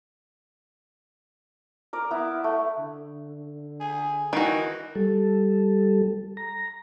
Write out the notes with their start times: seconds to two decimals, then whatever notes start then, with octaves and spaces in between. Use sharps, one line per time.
1.93 A#4 D5
2.11 B3 E4
2.44 A3
2.78 D3
3.80 G#4
4.33 D#3 E3 F#4
4.95 G3 A4
6.37 A#5